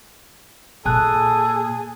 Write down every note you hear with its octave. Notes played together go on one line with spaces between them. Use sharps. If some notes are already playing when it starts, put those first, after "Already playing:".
A#2 G#4 A4 G#5 A5 F#6